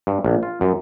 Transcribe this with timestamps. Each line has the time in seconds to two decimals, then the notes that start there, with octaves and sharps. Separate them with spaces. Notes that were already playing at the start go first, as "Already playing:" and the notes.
0.07 G2
0.25 A#1
0.43 F4
0.61 F#2